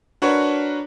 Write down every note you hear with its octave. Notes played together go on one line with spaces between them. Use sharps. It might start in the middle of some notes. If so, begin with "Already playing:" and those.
D4 F#4 A#4 B4 C#5